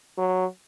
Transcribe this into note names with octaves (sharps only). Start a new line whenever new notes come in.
F#3